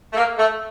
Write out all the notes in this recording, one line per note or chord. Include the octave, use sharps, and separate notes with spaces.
A3
A#3
A3